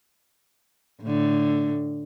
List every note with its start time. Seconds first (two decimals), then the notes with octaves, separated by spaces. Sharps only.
1.02 A2 D3